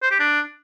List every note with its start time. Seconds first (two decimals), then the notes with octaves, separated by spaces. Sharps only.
0.02 C5
0.11 G4
0.19 D4